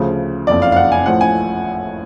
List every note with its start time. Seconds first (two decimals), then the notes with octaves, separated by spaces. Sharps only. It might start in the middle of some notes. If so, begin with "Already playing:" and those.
Already playing: D2 C#3 F3
0.47 F#1 F2 F3 D5
0.62 F5
0.72 F5
0.76 F#5
0.92 G#5
1.06 A1 A2 F3 F#5
1.21 G#5